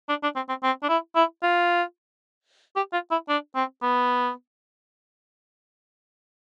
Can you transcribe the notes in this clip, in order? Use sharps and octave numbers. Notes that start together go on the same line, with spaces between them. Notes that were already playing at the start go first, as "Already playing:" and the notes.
D4
D4
C4
C4
C4
D4
E4
E4
F4
G4
F4
E4
D4
C4
B3